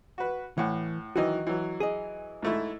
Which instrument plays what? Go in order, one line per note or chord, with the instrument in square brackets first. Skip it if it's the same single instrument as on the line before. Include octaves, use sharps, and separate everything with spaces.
[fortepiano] F#4 B4
[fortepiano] A2 F#5 [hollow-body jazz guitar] E3
[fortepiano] D#3 E3 F#3 [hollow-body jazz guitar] F#4 D#5
[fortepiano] E3 F#3
[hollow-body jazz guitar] G#4 D#5
[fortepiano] G#2 A3 E4